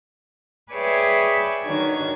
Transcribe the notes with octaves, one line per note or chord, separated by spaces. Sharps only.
G#4 B4 C#5 D5 E5 G5
D#3 D4 F#4 C#5 G#6